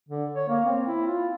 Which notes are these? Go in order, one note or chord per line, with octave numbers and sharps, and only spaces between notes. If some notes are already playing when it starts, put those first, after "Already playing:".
D3
C#5
A#3
C4
E4
F4